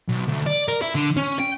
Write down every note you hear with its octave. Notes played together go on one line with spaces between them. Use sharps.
B1
D2
D5
A#4
E4
D3
C#4
G5